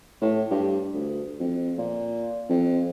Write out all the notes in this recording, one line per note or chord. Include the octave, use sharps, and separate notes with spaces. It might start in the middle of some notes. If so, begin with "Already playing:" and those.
A2
G2
D2
F2
A#2
F2